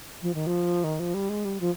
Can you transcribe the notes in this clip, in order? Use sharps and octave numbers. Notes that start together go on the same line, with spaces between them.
F3
D#3
F3
D#3
F3
G3
G#3
G3
F3